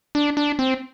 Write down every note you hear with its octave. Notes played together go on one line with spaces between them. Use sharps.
D4
D4
C4